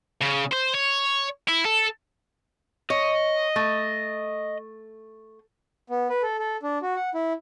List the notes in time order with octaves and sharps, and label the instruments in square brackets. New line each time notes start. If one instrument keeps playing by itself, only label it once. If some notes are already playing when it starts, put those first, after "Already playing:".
[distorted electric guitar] C#3
C5
C#5
E4
A4
[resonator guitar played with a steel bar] C#5 [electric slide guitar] D#5
[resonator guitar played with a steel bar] A3
[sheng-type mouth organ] B3
B4
A4
A4
D4
F#4
F#5
E4